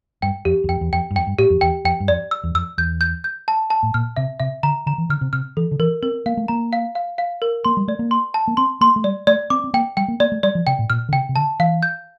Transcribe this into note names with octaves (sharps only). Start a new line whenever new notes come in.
G2 G5
F2 G4
E2
F2 G5
E2
F2 G5
G2
F2 G5
G2
A2 G4
F2
E2 G5
F2 G5
G2
F2 D5
E6
E2
F2 E6
E2 G6
G6
G6
A5
A5
A2
A#2 F6
C3 E5
C3 E5
D3 A#5
D3 A#5
E3
D3 F6
C3
C3 F6
E3 A4
D3
E3 A#4
C4 A#4
A#3 F5
A3
A#3 A#5
F5
F5
F5
A#4
A#3 C6
G3
A3 D5
A#3
C6
A5
A#3
C4 C6
A#3 C6
A3
G3 D5
A3 D5
C4 D6
C4
A#3 G5
G3 G5
A#3
A#3 D5
A3
G3 D5
F3
C3 G5
A2
A#2 F6
D3
C3 G5
C3
D3 A5
E3 F5
G6